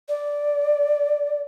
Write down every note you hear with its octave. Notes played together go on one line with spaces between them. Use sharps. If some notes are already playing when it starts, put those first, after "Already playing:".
D5